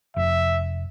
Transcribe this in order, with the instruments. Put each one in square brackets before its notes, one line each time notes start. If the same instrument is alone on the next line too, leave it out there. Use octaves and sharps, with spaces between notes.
[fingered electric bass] F1 [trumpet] E5